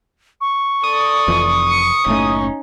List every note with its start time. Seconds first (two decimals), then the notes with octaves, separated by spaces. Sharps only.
0.41 C#6
0.83 A4 D5 D#6
1.28 F1 F2 E3
1.69 C#7
2.06 F#1 A2 A3 C#4 D#4